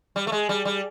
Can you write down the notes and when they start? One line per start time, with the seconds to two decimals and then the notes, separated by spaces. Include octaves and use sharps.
0.16 G3
0.27 A3
0.32 G#3
0.49 G3
0.65 G3